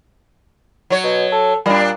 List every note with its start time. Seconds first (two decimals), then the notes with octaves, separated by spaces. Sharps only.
0.90 F#3 C#5
1.04 B2
1.32 A4
1.66 A#2 G3 D4